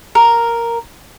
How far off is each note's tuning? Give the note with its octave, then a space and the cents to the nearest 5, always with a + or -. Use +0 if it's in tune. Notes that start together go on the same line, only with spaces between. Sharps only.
A#4 +0